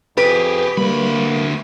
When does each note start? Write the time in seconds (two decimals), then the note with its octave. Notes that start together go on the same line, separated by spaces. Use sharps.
0.17 F2 G4 G#4 B4
0.77 D2 G3 A#3 B5